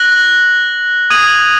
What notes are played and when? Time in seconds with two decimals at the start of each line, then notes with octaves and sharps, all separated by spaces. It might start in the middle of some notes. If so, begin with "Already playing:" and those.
Already playing: F#6 A#6 F#7
1.10 D#6 G#6 D#7 F#7